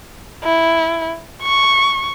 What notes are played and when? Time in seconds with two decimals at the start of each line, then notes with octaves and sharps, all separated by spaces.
0.44 E4
1.42 C#6